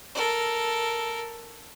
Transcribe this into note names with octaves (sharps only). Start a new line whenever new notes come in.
A4 A#4